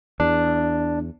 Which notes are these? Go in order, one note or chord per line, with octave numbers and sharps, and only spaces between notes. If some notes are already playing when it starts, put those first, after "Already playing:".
E2 D4